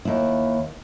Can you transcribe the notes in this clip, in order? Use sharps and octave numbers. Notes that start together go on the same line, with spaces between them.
D#2 E4